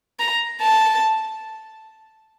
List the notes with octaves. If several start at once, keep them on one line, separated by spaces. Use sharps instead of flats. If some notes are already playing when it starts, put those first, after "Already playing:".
A#5
A5